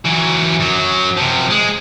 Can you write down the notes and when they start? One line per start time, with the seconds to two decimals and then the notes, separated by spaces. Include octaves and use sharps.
0.05 E3 F#3
0.60 F#2 F#3
1.17 C3 F3
1.50 G#3